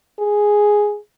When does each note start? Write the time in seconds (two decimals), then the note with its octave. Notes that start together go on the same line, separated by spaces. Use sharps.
0.20 G#4